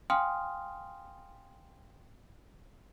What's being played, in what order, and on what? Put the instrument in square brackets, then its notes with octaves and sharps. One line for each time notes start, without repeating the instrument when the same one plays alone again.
[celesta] F5 G5 G#5 C6 D#6 F6